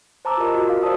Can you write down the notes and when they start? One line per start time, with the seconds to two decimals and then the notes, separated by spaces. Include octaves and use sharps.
0.25 C5 A5 A#5 D6 E6
0.37 F4 G4 A#4 D#5
0.54 F#4 A#4
0.69 F5
0.82 F#4 C5 D5 A5 D#6 E6